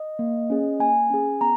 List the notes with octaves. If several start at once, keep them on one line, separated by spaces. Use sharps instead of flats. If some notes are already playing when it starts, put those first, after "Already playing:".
Already playing: D#5
A#3
C#4 G#4
A#3 G#5
C#4 G#4
B3 A#5